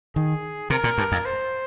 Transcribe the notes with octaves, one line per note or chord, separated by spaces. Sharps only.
D#3 G#4
C3 A#4
A#2
G2
F2
C5